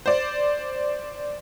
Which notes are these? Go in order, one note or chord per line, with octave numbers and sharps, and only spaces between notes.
C5 D5